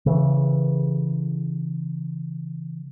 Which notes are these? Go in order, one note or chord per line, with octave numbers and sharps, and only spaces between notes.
C#3 E3